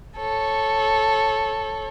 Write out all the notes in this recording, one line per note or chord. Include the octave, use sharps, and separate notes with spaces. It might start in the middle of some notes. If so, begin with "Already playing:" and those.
A4 C#5